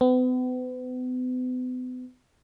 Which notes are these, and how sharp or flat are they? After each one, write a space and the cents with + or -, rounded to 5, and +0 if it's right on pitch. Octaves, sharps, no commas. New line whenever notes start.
B3 +40